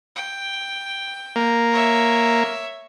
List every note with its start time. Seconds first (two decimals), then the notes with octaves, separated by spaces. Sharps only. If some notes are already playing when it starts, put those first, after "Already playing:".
0.16 G5
1.36 A#3
1.72 C#5 E5